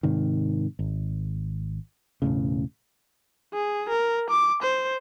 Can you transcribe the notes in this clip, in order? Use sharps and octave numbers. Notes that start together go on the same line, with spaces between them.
G#2 C3 D#3
G#1
E1 A#1 A2 C#3
G#4
A#4
D6
C5